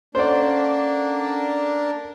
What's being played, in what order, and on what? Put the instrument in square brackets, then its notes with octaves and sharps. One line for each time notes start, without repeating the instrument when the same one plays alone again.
[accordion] A#3 D4 [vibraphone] C#4 A4 F#5 [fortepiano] C5 D5